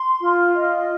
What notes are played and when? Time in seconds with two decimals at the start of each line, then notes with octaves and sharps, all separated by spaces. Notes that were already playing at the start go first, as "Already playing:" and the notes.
Already playing: C6
0.19 F4
0.56 D#5